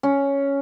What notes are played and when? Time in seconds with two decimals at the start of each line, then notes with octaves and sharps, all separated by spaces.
0.03 C#4